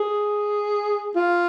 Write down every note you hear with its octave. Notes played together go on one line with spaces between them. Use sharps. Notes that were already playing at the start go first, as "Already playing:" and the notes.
Already playing: G#4
F4